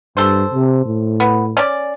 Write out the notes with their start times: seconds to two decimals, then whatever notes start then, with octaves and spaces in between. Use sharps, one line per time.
0.17 G2 A4 C5
0.53 C3
0.85 A2
1.20 B3
1.57 C#4 D5